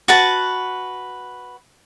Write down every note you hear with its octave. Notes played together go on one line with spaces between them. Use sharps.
F#4 B4 A5